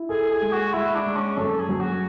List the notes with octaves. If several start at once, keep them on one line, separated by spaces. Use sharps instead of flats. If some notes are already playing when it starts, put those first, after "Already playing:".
Already playing: E4
G#4 A4
G#4
G#3
F#4
G#3 E4
D4
G#3
C#4
F#2 A4
G#4
F#3
F#4